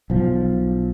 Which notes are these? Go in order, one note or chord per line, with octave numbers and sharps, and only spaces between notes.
B1 F3